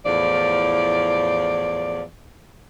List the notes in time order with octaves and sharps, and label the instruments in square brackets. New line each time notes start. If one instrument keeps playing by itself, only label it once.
[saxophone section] E2 A2 F3 D5